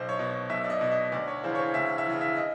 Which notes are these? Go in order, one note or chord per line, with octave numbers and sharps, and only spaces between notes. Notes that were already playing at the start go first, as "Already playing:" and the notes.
Already playing: B1 C5
C#5
B2
B1 E5
D5
D#5
B2
D#5
D2 D5
C#5
C#3 E3 C5
C#5
C5
D2 E5
E5
C#3 E3
E5
D#5